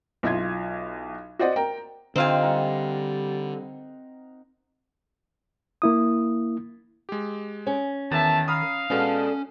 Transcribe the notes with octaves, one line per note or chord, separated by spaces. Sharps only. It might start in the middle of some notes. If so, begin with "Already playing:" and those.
B1 E4 F4 G#6
F#4 C5 D5 D#5 F#5
A#4 G5 A#5
D3 C4 D#4 F4 G4 F5 G#5
G3 A#4 F#5
A#3 E4 D#6
G#3 G4
C#4
E2 D#3 E5 A5
F5 A#5 B5 D#6
B2 G#3 B3 C#4 D4 A4